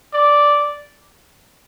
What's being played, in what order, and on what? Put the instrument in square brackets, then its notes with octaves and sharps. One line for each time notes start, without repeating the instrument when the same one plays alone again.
[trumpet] D5